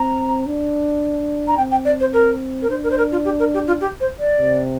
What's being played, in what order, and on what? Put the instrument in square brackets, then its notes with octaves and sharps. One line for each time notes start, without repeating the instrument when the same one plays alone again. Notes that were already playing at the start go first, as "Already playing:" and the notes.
Already playing: [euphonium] C4 [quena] A#5
[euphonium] D4
[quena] A#5
[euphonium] C4 [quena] G5
[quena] G5
D5
C5
A#4
A#4
[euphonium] D4 [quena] C5
[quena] A#4
C5
A#4
F4
G4
A#4
G4
F4
G4
C5
D5
[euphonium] C3